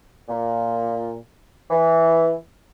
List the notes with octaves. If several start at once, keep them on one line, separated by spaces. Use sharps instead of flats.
A#2
E3